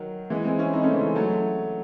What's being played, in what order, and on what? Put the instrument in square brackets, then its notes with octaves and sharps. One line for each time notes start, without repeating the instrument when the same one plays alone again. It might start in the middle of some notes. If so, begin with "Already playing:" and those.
Already playing: [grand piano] D#3 F#3
E3 G#3
G#3 C4
C#4 E4
C4 D#4
A3 C#4
C#3 E3
F#3 A3